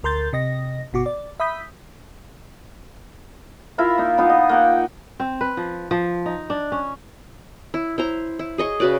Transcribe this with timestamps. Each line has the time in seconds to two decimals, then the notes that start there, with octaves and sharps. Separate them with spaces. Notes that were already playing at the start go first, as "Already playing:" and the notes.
0.03 D2 A#4 C6 G6 A6
0.33 C3 D#5 A#6
0.93 G1 B2 F#4 D6
1.06 D5
1.40 E5 B5 D#6 G6 B6
3.78 E4 F4 A#4 E5
3.98 A#3 D#4
4.17 E3 B3 D#4 F4
4.30 D#5
4.49 A#3 F#5 G5
5.20 C4
5.41 B4
5.57 F3
5.91 F3
6.26 D#4
6.50 D4
6.72 C#4
7.74 E4
7.98 E4 C5 A#5
8.39 E4
8.58 G#4 D#5 C#6
8.80 C#3 F#4 B4 D5